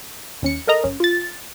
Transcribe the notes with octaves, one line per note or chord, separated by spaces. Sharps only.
D#2 C#4 C#7
A4 A#4 D#5 A#5
G1 C#4
F4 A6